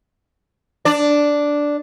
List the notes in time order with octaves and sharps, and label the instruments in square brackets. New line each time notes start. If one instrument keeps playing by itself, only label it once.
[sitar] D4 D5